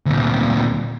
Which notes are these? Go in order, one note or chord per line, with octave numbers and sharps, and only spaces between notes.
D2 A#2